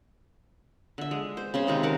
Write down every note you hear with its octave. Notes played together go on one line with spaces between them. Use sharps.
D3 E5
G#3
C5
C#3 C#4 C5
C3 D#3 G#3
A#4 F5 F#5